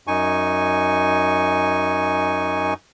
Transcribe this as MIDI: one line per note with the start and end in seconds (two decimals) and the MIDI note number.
0.07 2.74 42
0.07 2.74 63
0.07 2.74 80
0.07 2.74 85